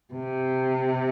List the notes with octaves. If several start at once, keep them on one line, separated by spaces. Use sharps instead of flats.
C3